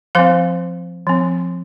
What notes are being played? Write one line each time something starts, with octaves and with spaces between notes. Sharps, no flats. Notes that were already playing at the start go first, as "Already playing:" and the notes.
F3 C4 C5 F5
F3 C4